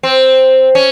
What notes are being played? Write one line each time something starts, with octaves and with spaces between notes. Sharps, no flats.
C4
C#4